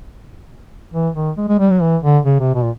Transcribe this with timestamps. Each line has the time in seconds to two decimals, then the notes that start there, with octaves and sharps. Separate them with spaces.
0.94 E3
1.15 D#3
1.37 G#3
1.48 G#3
1.59 G3
1.70 F#3
1.81 E3
2.03 D3
2.25 C#3
2.40 C3
2.54 B2
2.63 A#2